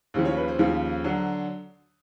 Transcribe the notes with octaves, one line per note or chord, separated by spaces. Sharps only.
D#2 C#3 F3 C5
C#5
B4
C5
D#2 C#3 F3
D3 F#3